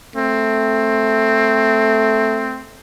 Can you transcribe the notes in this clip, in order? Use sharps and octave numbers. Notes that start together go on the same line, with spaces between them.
A3 C4